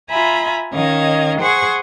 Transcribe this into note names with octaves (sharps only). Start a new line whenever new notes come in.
F4 E5 G#5 A#5 B5
D#3 C#4 D#5 F5 G#6
G#4 C5 F#5 G#5 C#6